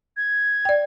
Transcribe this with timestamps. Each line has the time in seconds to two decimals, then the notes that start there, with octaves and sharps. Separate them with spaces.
0.17 G#6
0.65 D5 G5